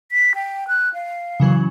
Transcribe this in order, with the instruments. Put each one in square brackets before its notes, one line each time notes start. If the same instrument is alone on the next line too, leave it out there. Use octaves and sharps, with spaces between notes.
[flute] B6
G5
F#6
F5
[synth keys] C#3 E3 F#3